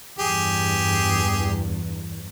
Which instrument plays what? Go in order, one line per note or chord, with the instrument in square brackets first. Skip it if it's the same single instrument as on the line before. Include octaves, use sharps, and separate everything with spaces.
[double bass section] E2 G2 [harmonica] G4 G#4